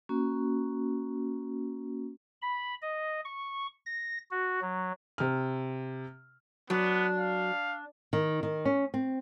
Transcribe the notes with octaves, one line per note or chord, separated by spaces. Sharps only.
A#3 C#4 F#4
B5
D#5
C#6
A#6
F#4
F#3
C3 F6
F#3 B3 D4
F5
D#3
D#3
C#4
C4